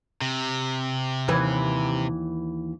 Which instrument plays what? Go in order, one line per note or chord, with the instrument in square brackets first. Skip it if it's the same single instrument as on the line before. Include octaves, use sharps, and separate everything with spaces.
[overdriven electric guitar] C3
[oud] D#2 E3 B4